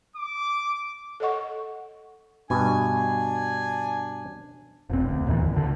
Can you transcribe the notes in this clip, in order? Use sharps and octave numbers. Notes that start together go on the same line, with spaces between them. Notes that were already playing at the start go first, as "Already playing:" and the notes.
D6
A4 C#5 D#5 F#5 C#6
G2 B2 D4 G#5
F1 B1 C4
D2
D#2 A2 D#3 E3
G#1 E2
C#2 D3